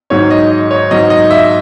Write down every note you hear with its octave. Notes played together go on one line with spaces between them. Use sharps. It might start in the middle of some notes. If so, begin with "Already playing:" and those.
G#2 D#3 F#3 C#5
D#5
D#5
C#5
G#2 D#3 F#3 D#5
D#5
E5